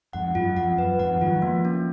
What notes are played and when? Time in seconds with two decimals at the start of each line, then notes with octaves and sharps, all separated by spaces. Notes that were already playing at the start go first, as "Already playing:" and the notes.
0.13 F2 G#2 F#5
0.35 F#2 F4
0.57 F2 F#5
0.78 F#2 B4
0.99 F2 G#2 F#5
1.21 D#3 F#3 F4
1.42 F3 G#3 A#3
1.65 C#4